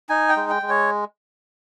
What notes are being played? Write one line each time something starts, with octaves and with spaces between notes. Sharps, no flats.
D#4 G#5
G5
G#3
G5
G#3
C#5